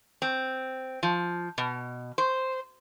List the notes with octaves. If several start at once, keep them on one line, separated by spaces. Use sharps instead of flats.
C4
F3
B2
C5